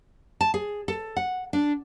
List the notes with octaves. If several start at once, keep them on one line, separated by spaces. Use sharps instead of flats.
A5
G#4
A4
F#5
D4